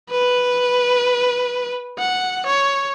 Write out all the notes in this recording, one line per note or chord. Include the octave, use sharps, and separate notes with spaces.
B4
F#5
C#5